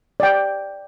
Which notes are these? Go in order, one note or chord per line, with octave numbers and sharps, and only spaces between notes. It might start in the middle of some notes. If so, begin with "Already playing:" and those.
D5 G5